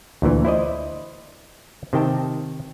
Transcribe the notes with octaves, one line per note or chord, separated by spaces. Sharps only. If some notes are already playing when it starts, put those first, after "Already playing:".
D2 A#2 E3
E4 C5 D5 D#5
C3 D#3 G5 A5